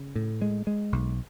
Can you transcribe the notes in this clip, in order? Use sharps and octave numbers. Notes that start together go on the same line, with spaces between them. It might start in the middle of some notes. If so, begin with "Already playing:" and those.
Already playing: C#3
A2
G#3
G#3
B1